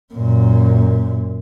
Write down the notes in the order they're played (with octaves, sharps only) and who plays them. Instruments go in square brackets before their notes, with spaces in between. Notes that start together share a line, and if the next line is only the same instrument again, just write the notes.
[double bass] F#2 A#2